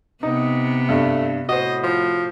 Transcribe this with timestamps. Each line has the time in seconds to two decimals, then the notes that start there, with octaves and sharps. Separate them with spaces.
0.23 C3 B3 D#4
0.89 G2 A3
1.49 A2 F#4 C5 D#5
1.83 F3